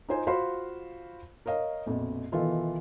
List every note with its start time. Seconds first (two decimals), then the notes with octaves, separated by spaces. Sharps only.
0.09 D#4 F4 C5 G#5
0.27 F4 F#4 C5 F5 B5 C6
1.46 A#4 C#5 D#5 F5
1.86 A#1 F2 B2
2.32 B2 D#3 E3 F4 A4